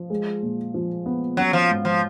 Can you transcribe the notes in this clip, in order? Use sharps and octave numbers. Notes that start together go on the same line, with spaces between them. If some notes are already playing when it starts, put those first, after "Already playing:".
Already playing: F3 F4
G#3
A#2
F3
B3
F#3 C#4
F3
G#2
F3